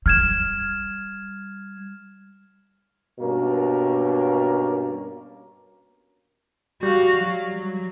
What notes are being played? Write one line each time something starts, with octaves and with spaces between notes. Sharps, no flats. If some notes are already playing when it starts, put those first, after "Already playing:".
G3 F6 G#6 E7
G2 B2 A#3 C#4 A#4
G3 F#4 F5
F#3
F#3